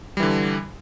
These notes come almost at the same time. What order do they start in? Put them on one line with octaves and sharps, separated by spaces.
G3 E3 D3